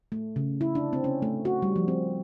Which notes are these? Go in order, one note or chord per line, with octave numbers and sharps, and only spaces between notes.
A3
C#3
E4
D4
C4
C#4
A3
F#4
G3
F3
C4